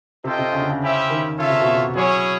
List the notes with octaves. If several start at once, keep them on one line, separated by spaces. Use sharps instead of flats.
C3 F4 A4 C5 D#5 G5
C3
C#3
D3
C#3
C#4 E4 G4 C5 E5
D#3
C#3 F4 A4 C#5 E5
C3
B2
C3
F#3 C#4 E4 G#4 C#5